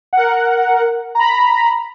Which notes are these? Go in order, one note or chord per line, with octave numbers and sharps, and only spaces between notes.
A#4 F#5
A#5 B5